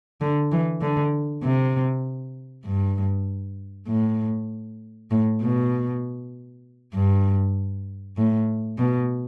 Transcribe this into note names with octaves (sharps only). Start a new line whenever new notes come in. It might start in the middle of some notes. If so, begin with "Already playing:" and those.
D3
E3
D3
C3
G2
A2
A2
B2
G2
A2
B2